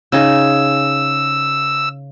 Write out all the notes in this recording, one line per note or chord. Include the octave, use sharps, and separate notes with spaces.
C#3 D#4 G#4 E6